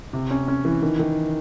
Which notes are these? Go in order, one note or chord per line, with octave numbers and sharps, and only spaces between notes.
C3
C#4
C#4
E3
D#3
D#3